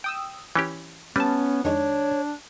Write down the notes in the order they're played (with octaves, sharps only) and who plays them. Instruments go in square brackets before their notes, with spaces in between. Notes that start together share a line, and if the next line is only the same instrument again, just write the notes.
[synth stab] G5 D#6 E6
[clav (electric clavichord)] E3 C#4 G4
[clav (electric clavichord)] G3 [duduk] B3 [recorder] C#4 [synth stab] B4 A5
[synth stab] F2 D#3 G#3 [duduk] D4 [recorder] C#5